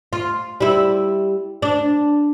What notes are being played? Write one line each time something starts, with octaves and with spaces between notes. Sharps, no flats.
F4
G3 E4
D4